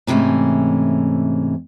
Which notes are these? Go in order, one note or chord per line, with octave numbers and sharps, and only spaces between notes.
G#2 C3 E3 G3 A3 C#4